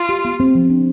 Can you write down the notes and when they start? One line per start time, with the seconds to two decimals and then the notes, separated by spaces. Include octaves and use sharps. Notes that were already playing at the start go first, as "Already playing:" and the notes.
Already playing: F4
0.09 G4
0.25 B3
0.40 C4
0.55 F3
0.70 D4